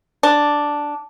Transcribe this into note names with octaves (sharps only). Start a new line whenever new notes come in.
D4